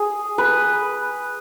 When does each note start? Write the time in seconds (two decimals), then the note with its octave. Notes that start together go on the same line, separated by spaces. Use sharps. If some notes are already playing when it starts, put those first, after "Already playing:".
Already playing: G#4
0.38 B4